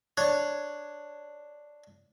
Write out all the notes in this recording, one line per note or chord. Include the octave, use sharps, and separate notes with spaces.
D4 C#5